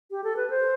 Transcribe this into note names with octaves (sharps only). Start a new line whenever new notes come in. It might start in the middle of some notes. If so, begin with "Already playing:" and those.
G4
A4
B4
C5